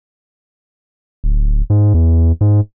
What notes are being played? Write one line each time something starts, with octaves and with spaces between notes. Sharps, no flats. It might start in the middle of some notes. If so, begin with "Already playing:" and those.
D1
G#2
E2
G#2